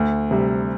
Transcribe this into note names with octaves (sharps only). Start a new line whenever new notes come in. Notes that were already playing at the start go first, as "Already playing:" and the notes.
Already playing: D2
C3 G3